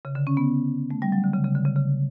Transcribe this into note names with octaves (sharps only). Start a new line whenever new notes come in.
C#3
D3
C#4
B3
A3
G3
F#3
D3
C#3
C#3
D3
C#3
C#3